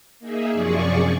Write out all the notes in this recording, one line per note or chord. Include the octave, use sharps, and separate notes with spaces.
A#3 D#4 G#4 E5
F#2 C3 F3 G#4 D5 C#6